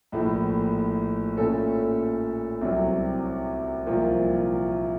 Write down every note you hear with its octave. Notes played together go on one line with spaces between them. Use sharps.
A#1 A2 A3
A#2 A3 C#4 A4
C2 C3 F#3
C2 A#2 F3 A#3